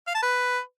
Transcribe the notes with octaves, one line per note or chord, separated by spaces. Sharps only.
F5
A5
B4